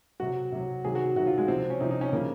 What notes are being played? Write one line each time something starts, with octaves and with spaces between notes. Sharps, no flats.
C3 F#3 F#4
C3 F#3
C3 D#3 F#3 G#4
F#4
C3 D#3 F#3 F#4
F4
G#3
C3 F3 C4
C#4
C3 F3 D#4
D#4
C#4
C#3 F3 A#3